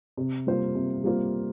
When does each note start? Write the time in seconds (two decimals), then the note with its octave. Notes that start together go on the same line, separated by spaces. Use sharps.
0.17 C3
0.47 G3 A#3 F4 C5
0.75 C3
1.04 G3 A#3 F4 C5